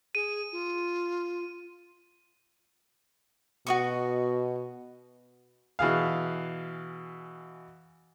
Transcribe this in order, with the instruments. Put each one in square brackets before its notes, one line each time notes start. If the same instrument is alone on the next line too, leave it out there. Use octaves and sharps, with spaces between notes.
[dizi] G#4 [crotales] D#7
[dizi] F4
[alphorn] B2 [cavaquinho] F#4 D#5 C#6
[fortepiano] B2 E3 G#4 F5